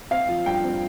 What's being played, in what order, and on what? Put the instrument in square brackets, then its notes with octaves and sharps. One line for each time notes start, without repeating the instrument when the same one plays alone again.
[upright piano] C4 F5
F3
G2 G5
C4